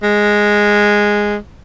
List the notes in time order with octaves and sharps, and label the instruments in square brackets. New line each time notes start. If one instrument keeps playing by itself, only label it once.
[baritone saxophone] G#3